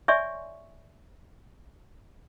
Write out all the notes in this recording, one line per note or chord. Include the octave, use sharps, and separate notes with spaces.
C#5 D5 E5 G#5 C6 C#6